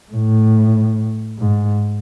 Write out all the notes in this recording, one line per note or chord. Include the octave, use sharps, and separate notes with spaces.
A2
G#2